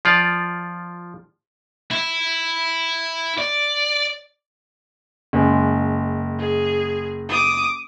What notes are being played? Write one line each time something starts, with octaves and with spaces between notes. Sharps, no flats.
F3 F4 D5
E4
D5
F#1 G#3
G#4
D6 D#6